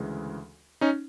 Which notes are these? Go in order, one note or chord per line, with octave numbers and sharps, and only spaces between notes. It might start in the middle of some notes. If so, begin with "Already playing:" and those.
Already playing: D2 C#3 E3 G#3
C#4 D#4